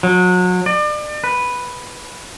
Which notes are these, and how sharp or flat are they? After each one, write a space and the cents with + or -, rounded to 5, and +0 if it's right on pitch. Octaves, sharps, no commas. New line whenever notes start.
F#3 -30
D5 +35
B4 +0